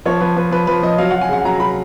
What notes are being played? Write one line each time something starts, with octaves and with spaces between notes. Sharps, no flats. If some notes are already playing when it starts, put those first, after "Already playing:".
F3 C#5
F3 B4
F3 B4
F3 B4
F3 B4
F3 D#5
F#3 F5
F#3 F#5
G#5
C#3 F#5
F#3 A#5
F#3 B5